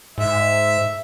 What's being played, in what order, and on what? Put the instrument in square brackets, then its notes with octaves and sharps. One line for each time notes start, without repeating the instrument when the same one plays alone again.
[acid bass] G#2 [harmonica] E5